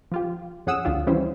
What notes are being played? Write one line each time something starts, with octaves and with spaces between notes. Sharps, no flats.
F3 F4 G4
F2 C#4 G#4 F#5 D#6 E6
D2 D3 D4 F4 G4
D#3 E3 G3 C#4 E4 C5